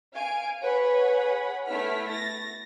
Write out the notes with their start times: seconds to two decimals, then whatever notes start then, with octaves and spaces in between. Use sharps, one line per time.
0.14 F5 G#5 D7
0.62 G#4 B4 C#5 F#5 B5
1.66 A3 B3 E4 F6 B6
2.09 A6 A#6